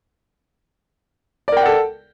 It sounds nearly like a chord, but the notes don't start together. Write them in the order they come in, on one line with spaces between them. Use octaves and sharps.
D5 A#4 G5 F#5 A4